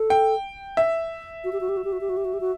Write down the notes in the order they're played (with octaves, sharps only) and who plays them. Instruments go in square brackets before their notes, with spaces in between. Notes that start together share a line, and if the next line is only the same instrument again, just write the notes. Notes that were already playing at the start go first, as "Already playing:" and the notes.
Already playing: [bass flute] A4
[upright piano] G5
E5
[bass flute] F#4
G4
F#4
G4
F#4
G4
F#4
G4
F#4
G4
F#4
G4
F#4